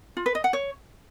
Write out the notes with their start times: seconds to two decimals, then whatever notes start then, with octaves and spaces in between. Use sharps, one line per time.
0.17 F4
0.26 B4
0.35 D#5
0.44 F#5
0.53 C#5